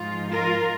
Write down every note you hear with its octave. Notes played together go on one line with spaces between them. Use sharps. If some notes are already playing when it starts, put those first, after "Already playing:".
Already playing: G#2 F3 G#3 D#4 F4
F4 A#4